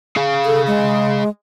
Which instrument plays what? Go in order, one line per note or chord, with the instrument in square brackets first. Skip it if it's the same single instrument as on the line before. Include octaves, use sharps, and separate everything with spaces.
[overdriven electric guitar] G#4 F5
[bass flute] A4
G#3